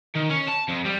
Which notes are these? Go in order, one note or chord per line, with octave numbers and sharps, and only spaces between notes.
D#3
C#4
A5
F2
G3